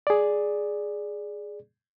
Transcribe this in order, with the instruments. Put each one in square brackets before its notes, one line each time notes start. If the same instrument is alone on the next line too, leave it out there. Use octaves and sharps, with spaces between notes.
[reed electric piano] G#4 D5